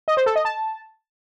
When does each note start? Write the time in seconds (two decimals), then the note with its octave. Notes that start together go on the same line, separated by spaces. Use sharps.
0.08 D#5
0.17 C5
0.26 A4
0.36 D#5
0.45 A5